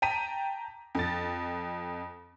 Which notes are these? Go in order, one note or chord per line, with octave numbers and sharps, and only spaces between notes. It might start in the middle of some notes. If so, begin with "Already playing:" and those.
G5 A5 A#5 B6 D#7
F2 A6